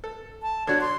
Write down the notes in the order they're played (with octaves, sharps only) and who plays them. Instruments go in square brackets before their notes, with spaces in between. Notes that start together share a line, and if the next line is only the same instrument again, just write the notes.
[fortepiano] A4
[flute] A5
[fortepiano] D3 D4 F#4 [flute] C#5
[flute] C6